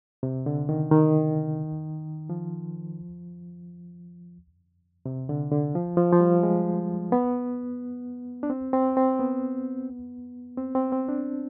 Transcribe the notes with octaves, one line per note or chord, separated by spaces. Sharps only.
C3
D3
D#3
D#3
F3
C3
D3
D3
F3
F3
F3
G3
G#3
B3
D4
C4
C4
C4
B3
C4
C4
C4
D4